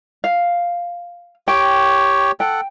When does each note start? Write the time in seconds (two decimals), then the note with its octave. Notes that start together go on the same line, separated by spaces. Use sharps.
0.24 F5
1.48 G4 C#5 G5
2.40 A4 F#5 G5